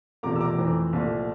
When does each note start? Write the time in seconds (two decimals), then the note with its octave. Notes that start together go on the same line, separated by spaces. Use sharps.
0.23 E1 E2 C3 F3 A3 A#5 D6
0.36 E6
0.40 A#5 D6
0.59 F2 E3 A3 C4
0.93 C2 A#2 F3 A3